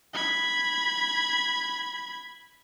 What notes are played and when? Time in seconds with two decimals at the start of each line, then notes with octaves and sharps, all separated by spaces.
0.14 B5 G#6